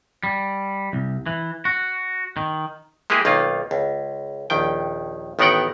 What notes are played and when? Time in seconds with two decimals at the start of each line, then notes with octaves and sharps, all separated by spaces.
0.23 G3
0.93 C2
1.26 E3
1.65 F#4
2.37 D#3
3.10 G#3 A#3 E4 G4 G#4
3.25 B1 D#3 A#3 F4
3.71 C#2
4.50 A#1 D#2 D#3 G5
5.39 A1 D#3 B3 A#4 F#5 G5